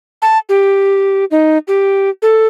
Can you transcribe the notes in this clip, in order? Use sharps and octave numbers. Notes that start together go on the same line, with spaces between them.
A5
G4
D#4
G4
A4